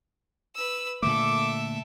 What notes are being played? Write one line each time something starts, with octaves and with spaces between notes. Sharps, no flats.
B4 E6
A#2 D3 A3 A4 E5 D6